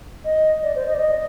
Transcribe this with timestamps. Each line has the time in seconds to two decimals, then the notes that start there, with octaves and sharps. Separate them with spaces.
0.25 D#5
0.63 D5
0.76 C5
0.87 D#5
0.94 D5
0.99 D#5